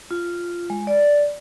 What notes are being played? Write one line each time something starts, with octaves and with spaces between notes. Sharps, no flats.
F4
G#3
D5